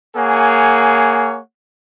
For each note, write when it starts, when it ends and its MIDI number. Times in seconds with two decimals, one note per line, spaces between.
0.16 1.39 58
0.16 1.39 68
0.16 1.39 73
0.16 1.39 78
0.16 1.39 80